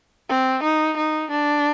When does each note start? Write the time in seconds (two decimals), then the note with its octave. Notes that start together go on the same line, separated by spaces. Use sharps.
0.29 C4
0.63 D#4
0.97 D#4
1.31 D4